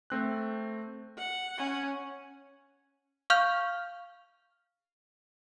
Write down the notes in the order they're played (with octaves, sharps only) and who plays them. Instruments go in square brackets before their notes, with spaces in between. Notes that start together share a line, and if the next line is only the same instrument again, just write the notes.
[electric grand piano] A3 C4 F#6
[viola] F#5
[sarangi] C#4
[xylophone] F5 C#6 F6 G6 F7